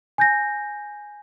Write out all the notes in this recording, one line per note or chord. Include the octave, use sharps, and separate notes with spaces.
G#5 G6 A#6